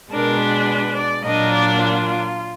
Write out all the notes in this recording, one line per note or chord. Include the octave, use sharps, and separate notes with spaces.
B2 G#3 D4 A#4
B4
D5
A#2 F#3 A#3 D4 D#5
D5
F4